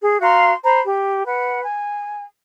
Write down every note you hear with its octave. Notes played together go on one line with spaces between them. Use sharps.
G#4
F#4 F5 A#5 C6
C5 A#5 B5
G4
B4 F#5
G#5